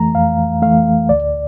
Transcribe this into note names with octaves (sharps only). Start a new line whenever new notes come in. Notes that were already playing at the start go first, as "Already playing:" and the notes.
Already playing: F2 E3 A3 A#5
F2 F5
E3 A3 F5
D2 D5